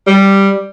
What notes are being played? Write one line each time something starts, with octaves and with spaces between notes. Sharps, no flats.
G3